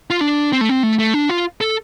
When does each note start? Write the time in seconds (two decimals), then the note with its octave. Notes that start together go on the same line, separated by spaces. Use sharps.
0.10 F4
0.21 D4
0.53 C4
0.61 A3
0.69 C4
0.83 A3
0.99 A3
1.14 D4
1.29 F4
1.61 A4